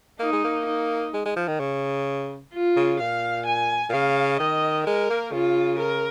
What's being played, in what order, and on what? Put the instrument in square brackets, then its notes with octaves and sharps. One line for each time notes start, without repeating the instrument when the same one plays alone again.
[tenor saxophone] A#3 [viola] D#4
[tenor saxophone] G#3
A#3
[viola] D#4
[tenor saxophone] G#3
G#3
F3
D#3
C#3
[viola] F4
[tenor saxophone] C#3
[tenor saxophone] A#2 [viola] F5
[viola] G#5
[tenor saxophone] A#2
[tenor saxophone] C#3 [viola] F5
[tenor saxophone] D#3 [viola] D#5
[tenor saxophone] G#3 [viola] A#4
[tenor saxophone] A#3
[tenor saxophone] C#3 [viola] F4
[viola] A#4